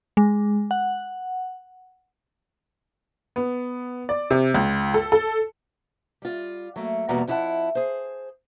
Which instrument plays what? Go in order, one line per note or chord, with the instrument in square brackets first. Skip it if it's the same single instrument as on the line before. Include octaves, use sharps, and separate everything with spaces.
[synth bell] G#3
F#5
[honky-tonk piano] B3
D5
C3
C#2
A4
A4
[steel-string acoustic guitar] G3 F4
F#3 A3 A#3
E2 B2 G3 A#3 F#4 A#5
F2 C#4 E4 G#4 F#5 A5
G#4 C5